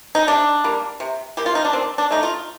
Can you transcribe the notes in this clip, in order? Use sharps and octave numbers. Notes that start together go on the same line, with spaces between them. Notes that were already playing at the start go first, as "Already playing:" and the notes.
D#4
C3 D4
G3 A#3
C3
G3 A#3 G4
F4
D#4
D4
D#3 C4
D4
A3 D#4
F4